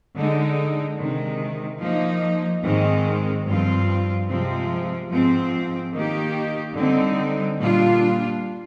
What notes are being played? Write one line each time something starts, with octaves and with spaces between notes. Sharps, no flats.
D3 G#3 D#4
C3 D#3 G#3
F3 A#3 D#4
G#2 D#3 G#3 C4
G2 F3 C4 F4
C3 F3 G#3 C4
G#2 F3 C4
D#3 A#3 D#4 G4
D3 G3 C4 D#4
A#2 G3 D4 F4